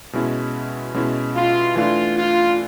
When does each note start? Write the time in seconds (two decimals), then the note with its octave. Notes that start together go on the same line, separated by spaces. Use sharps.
0.13 B2 G#3 C#4 E4
0.94 B2 G#3 C#4 E4
1.36 F4
1.75 E3 A3 D4 F4
2.17 F4